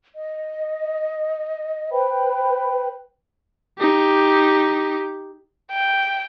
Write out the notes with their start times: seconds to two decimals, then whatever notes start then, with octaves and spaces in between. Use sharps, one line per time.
0.15 D#5
1.92 B4 C5 G5 B5
3.78 D#4 G4
5.72 G5